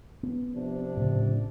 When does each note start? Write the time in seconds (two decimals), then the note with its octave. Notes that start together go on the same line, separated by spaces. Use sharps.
0.23 B3
0.55 C3 F3 D4
0.97 A2 C#3